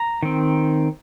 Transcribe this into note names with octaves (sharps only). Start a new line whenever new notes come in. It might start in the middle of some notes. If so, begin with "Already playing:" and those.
Already playing: A#5
D#3 C4